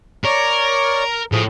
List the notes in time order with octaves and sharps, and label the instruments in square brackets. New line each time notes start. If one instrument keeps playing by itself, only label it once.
[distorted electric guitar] A#4 [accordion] C#5 D5 C#6
[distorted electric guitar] A2 [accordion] F3 G#4